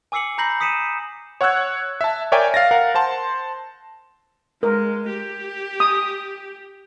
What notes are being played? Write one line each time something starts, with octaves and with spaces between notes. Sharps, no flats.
G#5 D6 E6 C7 C#7 F#7
A#5 B5 G6 A#6 C7 F#7
D#6 B6 C#7 D#7 E7
C#5 F#5 C#6 E6 F#6 G#6
E5 A5
A#4 C#5 D5 E5 G5 G#5
F5 A6 A#6
A#4 F5 F#5
C5 F#5 A5 C6
G#3 A#4
G4
D#6